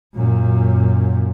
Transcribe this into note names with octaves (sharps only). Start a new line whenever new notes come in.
F#2 A#2